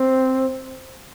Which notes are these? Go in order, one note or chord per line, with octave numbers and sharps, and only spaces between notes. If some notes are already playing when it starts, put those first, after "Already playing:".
Already playing: C4